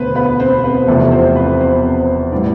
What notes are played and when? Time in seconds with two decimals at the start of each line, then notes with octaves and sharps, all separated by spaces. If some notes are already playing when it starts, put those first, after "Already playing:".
Already playing: E1 D2 D3 B3 B4 C5
0.15 B3 B4
0.40 C4 C5
0.64 B3 B4
0.87 F1 E2 C3 F3 A3 A4
1.11 C4 C5
1.36 B3 B4
1.60 C4 C5
2.32 A2 G3 B3 D4 E4 D5